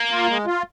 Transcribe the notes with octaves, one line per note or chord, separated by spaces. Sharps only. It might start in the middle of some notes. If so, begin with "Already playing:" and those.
Already playing: A#3
F4
G#3
F4